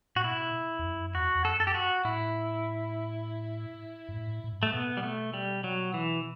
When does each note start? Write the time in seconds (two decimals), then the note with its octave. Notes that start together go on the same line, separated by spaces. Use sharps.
0.16 A2 F#4
0.24 B2 E4
0.79 E2
0.84 F#2
1.14 E2 F#4
1.35 E2
1.45 F#2 A4
1.60 A4
1.67 G4
1.74 F#4
2.05 A2 E4
4.09 G2
4.14 A2
4.44 A2
4.52 G2
4.61 A2 A3
4.73 B2 B3
4.97 G3
5.03 A3
5.34 G3
5.64 F#3
5.94 E3